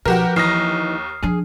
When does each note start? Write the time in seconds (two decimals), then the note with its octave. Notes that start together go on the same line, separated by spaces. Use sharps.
0.05 B1 F3 F#4 G4 A#4 B4 E7
0.36 D#2 E3 D#4 D#6 F6 A#6 C7
1.22 F3 D4 G#4